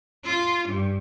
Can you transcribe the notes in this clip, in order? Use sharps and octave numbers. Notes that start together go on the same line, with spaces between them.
F4
G2